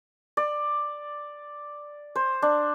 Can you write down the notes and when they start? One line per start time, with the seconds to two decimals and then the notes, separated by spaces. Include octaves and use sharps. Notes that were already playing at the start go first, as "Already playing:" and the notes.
0.37 D5
2.16 C5
2.42 D4